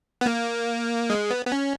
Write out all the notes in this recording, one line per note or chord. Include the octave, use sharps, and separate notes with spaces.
B3
A#3
G#3
B3
B3
C#4